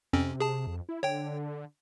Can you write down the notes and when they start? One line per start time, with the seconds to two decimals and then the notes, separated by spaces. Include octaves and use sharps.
0.13 F2 C3 C4 C#4
0.40 G#4 A5
0.67 F2
0.89 E4
1.03 D3 C#5 G5